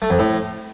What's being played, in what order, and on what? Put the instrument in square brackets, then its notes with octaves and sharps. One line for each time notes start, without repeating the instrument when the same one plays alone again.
[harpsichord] A3
F2
A2